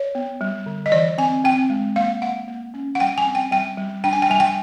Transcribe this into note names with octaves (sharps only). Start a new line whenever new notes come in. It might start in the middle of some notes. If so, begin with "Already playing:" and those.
Already playing: C#5
B3
G3
D3
D#5
E3 D5
C4 G#5
C4 G5
G#3
A#3 F5
A#3 F#5
A#3
C#4
F#5
G3 G5
G#5
C4
G5
G3 G5
G3
D4 G5
G#5
G5
G3 G#5
G5